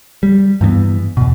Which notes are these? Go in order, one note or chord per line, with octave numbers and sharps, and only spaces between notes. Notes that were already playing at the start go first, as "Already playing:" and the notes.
G3
G2 E3 A#3 B3
E2 B2